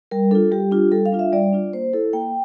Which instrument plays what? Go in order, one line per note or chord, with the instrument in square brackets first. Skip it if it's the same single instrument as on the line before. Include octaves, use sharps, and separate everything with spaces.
[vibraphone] G3 A#4
D4 F4 A4
G3 G4
D4 F4
G3 A4
F5
D4 F4
E5
G3 D5
D4 F4
A#3 C5
E4 A4
A#3 G5